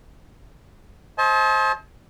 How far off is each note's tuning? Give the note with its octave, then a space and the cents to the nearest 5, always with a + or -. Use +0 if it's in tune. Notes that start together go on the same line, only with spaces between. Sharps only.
C5 +25 D#5 +40 A5 -35